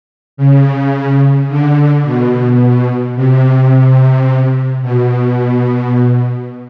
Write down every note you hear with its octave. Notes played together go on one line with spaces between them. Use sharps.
C#3
D3
B2
C3
B2